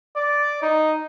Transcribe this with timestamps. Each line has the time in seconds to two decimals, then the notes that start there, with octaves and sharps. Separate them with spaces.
0.16 D5
0.62 D#4